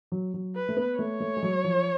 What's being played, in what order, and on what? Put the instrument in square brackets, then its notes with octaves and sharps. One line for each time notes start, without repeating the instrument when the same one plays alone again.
[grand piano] F#3
F#3
[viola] B4
[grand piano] A3
B3
[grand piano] A3 [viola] C#5
[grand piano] A3
G#3
F#3
F3